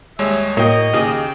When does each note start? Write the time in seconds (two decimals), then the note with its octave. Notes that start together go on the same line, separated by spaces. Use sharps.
0.19 D#2 G3 G#3 C#5 E5
0.57 A2 A#3 F#4 C#5 D#5 G5
0.93 D#2 C#3 G#4 G5